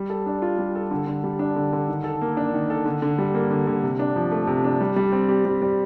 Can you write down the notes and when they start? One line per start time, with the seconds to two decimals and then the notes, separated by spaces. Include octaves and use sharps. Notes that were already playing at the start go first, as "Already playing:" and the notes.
Already playing: G3
0.10 A4
0.26 D4
0.42 F4
0.58 G3
0.75 A4
0.91 D3
1.07 D3
1.24 G3
1.39 D4
1.56 D3
1.73 D3
1.88 D#3
2.04 A4
2.21 A#3
2.37 D4
2.54 D#3
2.70 A4
2.86 D3
3.02 D3
3.18 G3
3.34 A#3
3.50 D3
3.67 D3
3.83 C3
3.99 D4
4.16 F3
4.31 A3
4.47 C3
4.64 D4
4.80 G3
4.96 G3
5.12 C4
5.29 G4
5.45 G3
5.62 G3